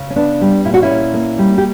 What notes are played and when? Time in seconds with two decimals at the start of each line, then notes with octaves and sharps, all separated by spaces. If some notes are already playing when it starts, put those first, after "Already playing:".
Already playing: C#3
0.10 C#4
0.16 B3 D4
0.41 G3
0.65 A#2 E4
0.74 F#4
0.83 C#4 E4
0.90 A#2
1.14 A#3
1.39 G3
1.58 G4